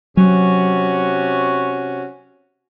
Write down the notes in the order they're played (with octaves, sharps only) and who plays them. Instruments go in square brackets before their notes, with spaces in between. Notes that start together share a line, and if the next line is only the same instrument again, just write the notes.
[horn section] C3 C#4 F#4 [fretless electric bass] F#3